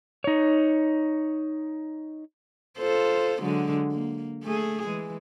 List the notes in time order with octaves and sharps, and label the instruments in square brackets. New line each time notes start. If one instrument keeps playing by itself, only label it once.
[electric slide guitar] D#4 C#5
[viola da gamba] F4 A4 C5
D3 F#3 G#3
A#3
A3 G#4
E3 G#3